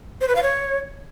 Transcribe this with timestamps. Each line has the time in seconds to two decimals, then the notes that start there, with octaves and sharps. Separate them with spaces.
0.21 C5
0.28 B4
0.35 F5
0.43 C#5